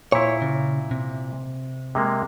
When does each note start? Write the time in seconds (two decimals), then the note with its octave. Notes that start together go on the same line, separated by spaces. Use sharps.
0.12 A#2 E4 C#5
0.42 C#3
0.91 C3
1.95 C3 G#3 A#3